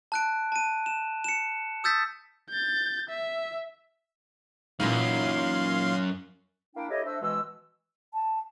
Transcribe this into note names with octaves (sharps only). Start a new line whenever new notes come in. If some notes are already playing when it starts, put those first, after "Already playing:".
A5 F#6 D7
A5 D#7
E7
C#7 E7
D#6 E6 G6 A6 B6
G6 A6
E5
F#2 A#2 E3 D#4 F5 C6
A#3 D4 E4 G5
E4 G4 A4 C#5 D#5
A3 D4 C5 E5 E6
B2 E3 G#3 E6
A5